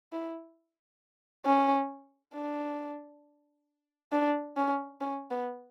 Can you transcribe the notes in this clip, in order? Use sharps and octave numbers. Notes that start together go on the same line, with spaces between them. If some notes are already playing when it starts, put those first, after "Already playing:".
E4
C#4
D4
D4
C#4
C#4
B3